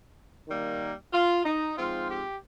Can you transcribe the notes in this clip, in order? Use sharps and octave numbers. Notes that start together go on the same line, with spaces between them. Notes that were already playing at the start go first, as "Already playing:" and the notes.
D#3 G3 A#3
F4
D#4
G#2 F3 C4 F4
G4